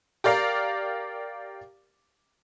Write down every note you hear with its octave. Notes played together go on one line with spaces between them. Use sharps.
G4 A#4 D5 F5 A#5